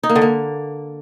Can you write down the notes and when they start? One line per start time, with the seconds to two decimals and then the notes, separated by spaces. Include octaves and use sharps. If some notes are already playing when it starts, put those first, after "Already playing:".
0.03 D#4
0.09 A#3
0.15 D3
0.21 A#3